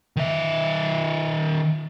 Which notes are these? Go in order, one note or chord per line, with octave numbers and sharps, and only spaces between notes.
D#3 E5